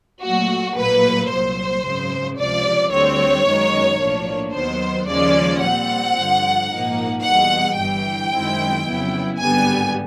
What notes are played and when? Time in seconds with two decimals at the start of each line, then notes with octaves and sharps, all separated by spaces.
0.22 A#2 F#3 A3 F#4
0.76 A#1 A2 F#3 A#3 B4
1.30 C2 A#2 F#3 C5
1.84 G#1 F#2 C#3 F#3
2.38 C#2 C3 F3 D5
2.92 D2 D3 G3 C4 C#5
3.46 F#2 D#3 G#3 B3 D#4
4.00 B1 A2 F3 A#3 D4
4.54 D#2 D#3 F#3 B3 C5
5.08 D#2 C#3 F3 G#3 C#4 D5
5.62 A#2 G3 C4 F#5
6.16 G2 D3 F3
6.70 A#1 G#2 F3 A#3 D#4
7.23 E2 B2 G3 F#5
7.77 G1 G2 E3 G5
8.32 F#2 D#3 G#3 C4 E4
8.86 F2 C#3 F#3 B3 E4
9.39 G#1 G2 D3 G3 B3 G#5